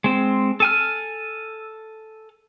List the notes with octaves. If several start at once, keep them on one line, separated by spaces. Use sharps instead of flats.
G#3 C4
A4 G#5 F6